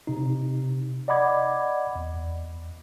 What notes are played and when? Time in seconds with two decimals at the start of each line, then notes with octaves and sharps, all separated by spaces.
0.07 C3 D#4
1.08 D5 D#5 F#5 B5 D6 G#6
1.95 E2